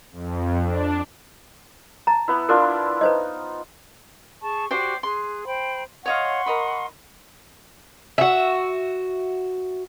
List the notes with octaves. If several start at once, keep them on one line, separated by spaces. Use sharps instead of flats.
F2
D4
A5 A#5
B3 E4
D4 E4 F4 A#4
D#4 B4 C5 D#5
G#4 A5 C#6
F#4 G4 C5 D5 G5
G#4 C6 F#6
C5 G5 B5
C#5 D#5 F5 F#5 C6 C#6
A#4 D#5 B5
F#4 E5